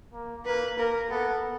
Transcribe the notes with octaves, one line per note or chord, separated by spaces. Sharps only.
A#3
A#3 B4
A#3 A#4
B3 A4